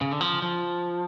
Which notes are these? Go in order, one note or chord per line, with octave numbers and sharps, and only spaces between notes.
C#3
D3
F3
F3